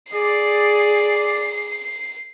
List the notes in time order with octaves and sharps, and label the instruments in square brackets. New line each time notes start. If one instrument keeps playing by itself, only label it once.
[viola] G#4 [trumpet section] D5 [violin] C7